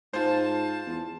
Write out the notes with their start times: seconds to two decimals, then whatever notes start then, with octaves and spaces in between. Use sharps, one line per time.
0.13 G#2 F4 C5 A5
0.87 E2